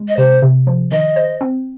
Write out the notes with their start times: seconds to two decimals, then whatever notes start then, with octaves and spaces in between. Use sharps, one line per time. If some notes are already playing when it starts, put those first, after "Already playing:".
Already playing: G#3
0.08 D#5
0.17 C3 C5
0.42 C3
0.67 F3
0.92 D#3 D#5
1.16 C5
1.41 C4